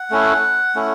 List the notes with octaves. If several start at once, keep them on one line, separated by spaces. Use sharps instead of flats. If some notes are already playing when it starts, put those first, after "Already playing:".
Already playing: F#5
A3 C#4 E4
A3 C#4 E4